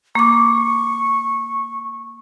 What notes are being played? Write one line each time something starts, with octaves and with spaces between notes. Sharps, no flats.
A#3 C#6 D6